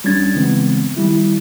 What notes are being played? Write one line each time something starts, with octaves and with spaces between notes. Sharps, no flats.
D#2 G3 C#4 D4 G#6 A6
C#3 E3 G#3 B3 C4
D#3 G3 E4